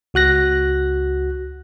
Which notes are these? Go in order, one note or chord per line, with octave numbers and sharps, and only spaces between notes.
C#2 F#4 F#6 A#6